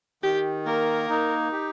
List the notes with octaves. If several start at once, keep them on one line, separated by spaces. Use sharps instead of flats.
D#3 G4
A#3 A#4
D#4
G4